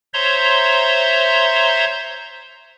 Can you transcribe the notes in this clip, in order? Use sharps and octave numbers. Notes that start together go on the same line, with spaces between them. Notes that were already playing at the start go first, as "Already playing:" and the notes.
C5 C#5 E5 A#5 C6